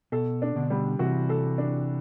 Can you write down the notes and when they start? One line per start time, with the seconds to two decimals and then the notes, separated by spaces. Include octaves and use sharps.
0.12 B2 A4
0.42 D4
0.56 B2 D3
0.70 G3
0.99 C3 E3 F#4
1.29 A4
1.58 D4